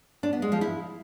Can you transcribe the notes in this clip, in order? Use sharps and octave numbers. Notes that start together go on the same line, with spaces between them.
D4
B3
G#3
F3
E4